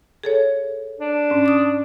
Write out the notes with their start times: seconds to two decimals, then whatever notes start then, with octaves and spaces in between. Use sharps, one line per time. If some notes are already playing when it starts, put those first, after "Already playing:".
0.24 G#4 A4 C#5
1.00 D4
1.30 G#2 C#4
1.46 D6 D#6